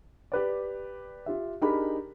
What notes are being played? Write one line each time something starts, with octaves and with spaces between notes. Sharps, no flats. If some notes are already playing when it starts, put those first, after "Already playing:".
G4 B4 D5
F4 G4 E5
D4 D#4 G4 G#4 A#4 B5